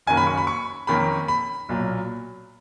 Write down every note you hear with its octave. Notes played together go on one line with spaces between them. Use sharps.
F#1 F#2 D#3 A#3 C#4 G#5
B5
C#6
B5
C#6
F2 D#3 A#3 C#4 B5
B5
B1 A#2 F#3